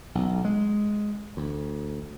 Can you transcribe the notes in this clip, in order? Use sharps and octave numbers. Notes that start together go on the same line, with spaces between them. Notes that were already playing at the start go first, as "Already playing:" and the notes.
B1
G#3
D2